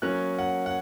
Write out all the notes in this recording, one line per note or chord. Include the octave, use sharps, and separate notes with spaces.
F#3 A#3 C#4 F#6
F#5
F#5